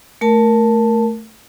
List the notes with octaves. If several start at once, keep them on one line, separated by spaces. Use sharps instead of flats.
A3 A#4 A5